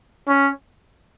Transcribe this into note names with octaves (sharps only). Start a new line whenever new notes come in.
C#4